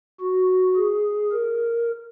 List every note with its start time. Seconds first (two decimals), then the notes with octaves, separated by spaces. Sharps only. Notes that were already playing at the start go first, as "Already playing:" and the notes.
0.20 F#4
0.76 G#4
1.32 A#4